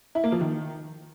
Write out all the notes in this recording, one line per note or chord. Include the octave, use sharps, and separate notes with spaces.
E4
A#3
F3
D#3